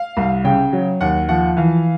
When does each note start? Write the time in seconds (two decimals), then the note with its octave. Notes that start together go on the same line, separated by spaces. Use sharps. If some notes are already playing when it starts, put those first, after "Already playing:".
Already playing: F5
0.17 C2
0.44 C#3 G5
0.73 F#3
1.01 D#2 F#5
1.29 F3 F#5
1.57 E3 F5